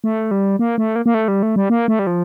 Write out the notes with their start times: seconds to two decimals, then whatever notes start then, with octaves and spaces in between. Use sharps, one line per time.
0.04 A3
0.31 G3
0.59 A#3
0.78 A3
0.96 A#3
1.06 A#3
1.14 A3
1.28 G3
1.43 A3
1.56 G3
1.70 A#3
1.88 A3
1.99 G3
2.07 F3